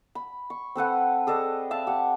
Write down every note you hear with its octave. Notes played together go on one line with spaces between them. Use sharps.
B5
C#6
C4 A4 B4 F#5
G#4 A4 D5 D#5
E5 F5 A5
G4 F#5